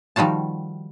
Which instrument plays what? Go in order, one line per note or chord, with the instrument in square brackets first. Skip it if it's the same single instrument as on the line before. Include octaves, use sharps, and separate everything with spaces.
[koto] D#3 F3 G3 F#4 A5